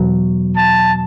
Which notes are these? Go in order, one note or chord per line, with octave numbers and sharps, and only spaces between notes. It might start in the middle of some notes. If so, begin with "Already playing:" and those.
Already playing: E2 B2 F#3
A5